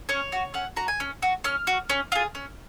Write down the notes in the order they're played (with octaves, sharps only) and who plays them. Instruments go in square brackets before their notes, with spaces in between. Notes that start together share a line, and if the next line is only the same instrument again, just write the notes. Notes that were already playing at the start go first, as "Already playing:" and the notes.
[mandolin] C#4 C#5
F#4
C#4 F#5
F#4 A#5
G#5
C#4
F#4
C#4 F6
F#4
C#4
F4 G#4
C#4